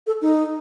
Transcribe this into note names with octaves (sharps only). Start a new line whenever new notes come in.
A4
D#4